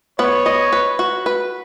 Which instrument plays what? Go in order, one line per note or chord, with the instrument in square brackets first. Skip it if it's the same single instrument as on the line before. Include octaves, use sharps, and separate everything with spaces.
[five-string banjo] B3 [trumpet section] C#5
[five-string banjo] D#5
B4
F#4
B4